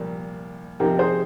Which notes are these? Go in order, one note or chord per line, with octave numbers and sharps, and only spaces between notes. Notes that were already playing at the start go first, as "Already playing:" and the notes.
Already playing: C2 A#2 F3 A#3
C3 F3 C4 D#4 G4 A#4
G#4 C5